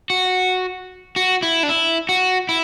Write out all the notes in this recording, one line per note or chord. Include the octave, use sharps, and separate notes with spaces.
F#4
F#4
E4
D4
E4
F#4
E4